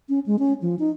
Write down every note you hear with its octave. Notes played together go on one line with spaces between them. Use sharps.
C#4
G#3
C#4
F3
D#4